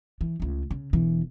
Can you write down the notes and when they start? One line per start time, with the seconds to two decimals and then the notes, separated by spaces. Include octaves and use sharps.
0.21 E3
0.40 C#2 A3
0.71 C#3
0.93 E1 E3